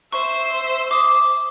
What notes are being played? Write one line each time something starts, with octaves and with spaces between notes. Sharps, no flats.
C5 E5 C#6
D6 D#6